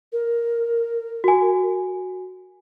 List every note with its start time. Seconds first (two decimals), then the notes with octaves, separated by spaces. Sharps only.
0.13 A#4
1.24 F#4 G#5